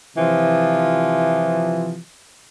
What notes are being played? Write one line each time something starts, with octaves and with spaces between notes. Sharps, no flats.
C3 E3 F3